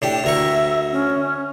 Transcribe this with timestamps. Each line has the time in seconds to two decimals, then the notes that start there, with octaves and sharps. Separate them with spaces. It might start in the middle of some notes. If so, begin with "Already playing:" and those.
0.02 A2 D4 G4
0.24 D2 A#4 E5 C#6
0.92 C#4